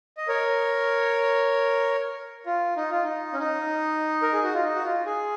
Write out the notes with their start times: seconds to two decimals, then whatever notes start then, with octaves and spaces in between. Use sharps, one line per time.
0.17 D#5
0.28 A#4 C#5
2.46 F4
2.77 D#4
2.91 F4
3.04 D#4
3.33 C#4
3.40 D#4
4.22 A#4
4.33 G#4
4.43 F#4
4.54 F4
4.65 D#4
4.75 F#4
4.85 F4
5.06 G#4